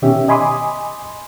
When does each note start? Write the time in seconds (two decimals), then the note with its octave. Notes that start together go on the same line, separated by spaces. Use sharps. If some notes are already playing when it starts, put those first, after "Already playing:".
0.02 B2 D#3 C#4 G4 E5
0.28 D#5 G#5 B5 C6 D6 D#6